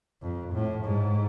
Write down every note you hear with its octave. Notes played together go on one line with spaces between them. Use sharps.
F2
A2
G#2